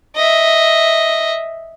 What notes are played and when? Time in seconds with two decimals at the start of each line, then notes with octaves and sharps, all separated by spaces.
0.16 D#5 E5